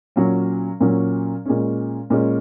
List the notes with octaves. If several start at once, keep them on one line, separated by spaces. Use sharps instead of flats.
A#2 F#3 C#4
A#2 F#3 C#4
A#2 G#3 C#4
A#2 G#3 C#4